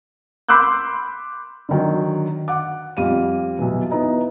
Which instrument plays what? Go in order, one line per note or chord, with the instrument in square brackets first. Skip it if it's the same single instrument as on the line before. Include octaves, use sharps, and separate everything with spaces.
[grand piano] B5 C6 D6 E6 F#6 G6
[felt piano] D3 D#3 F#3
F#5 D6
F2 G3 F5 D#7
B1 E3
B3 D#4 E4